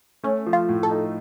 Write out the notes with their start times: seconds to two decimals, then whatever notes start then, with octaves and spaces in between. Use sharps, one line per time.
0.23 A3 C#4
0.46 F3
0.53 F4
0.69 A2
0.83 A4
0.90 D#4